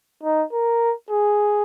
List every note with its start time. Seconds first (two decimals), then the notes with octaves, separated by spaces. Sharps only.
0.24 D#4
0.53 A#4
1.11 G#4